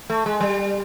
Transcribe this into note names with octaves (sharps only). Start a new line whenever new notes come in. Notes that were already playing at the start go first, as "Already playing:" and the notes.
A3
G#3
G3